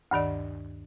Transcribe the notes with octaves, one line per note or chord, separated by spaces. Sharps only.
D2 G2 D#3 D5